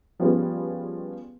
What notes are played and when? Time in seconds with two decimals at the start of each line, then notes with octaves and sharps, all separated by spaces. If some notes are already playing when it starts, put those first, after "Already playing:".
0.20 F3 G3 B3 C#4 G#4 B4